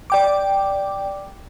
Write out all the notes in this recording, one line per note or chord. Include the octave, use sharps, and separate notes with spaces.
D5 G5 D6